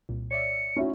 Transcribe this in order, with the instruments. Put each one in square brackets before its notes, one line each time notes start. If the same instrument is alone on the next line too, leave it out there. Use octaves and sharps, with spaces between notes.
[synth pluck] C2 A#2
[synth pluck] C#5 D5 E5 [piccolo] C#7
[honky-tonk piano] C#4 E4 F#4 [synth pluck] D#4